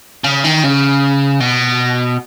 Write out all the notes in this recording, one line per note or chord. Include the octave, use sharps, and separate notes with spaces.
C#3
D#3
C#3
B2